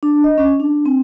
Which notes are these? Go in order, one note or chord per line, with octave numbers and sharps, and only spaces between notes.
D4
D#5
C#4
D4
C4